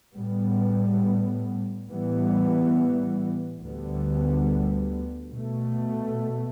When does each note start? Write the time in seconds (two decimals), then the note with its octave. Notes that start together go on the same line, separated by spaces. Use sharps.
0.17 A2 G3 B3
1.89 A2 E3 G3 B3
3.61 D2 D3 G3 B3
5.33 B2 A3